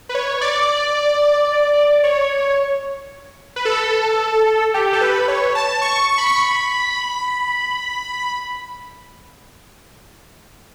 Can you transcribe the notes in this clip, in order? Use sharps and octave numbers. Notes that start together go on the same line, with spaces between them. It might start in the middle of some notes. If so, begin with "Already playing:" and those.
B4
C#5
D5
C#5
B4
A4
G4
A4
B4
C#5
A5
C#6
C#6
B5
C#6
B5